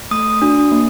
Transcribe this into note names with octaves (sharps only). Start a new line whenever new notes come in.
A3 D#6
D4 F#4
A#3